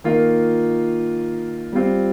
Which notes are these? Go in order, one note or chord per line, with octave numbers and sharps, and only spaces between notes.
D#3 A#3 F4
G3 C4 F4